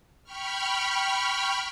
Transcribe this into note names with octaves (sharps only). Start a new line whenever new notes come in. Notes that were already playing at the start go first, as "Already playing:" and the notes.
G5 B5 C#6 F6